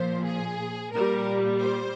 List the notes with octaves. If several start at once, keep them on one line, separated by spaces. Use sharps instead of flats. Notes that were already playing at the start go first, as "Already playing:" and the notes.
Already playing: A#2 F3 C5
G#4
A#2 G3 A#4
C5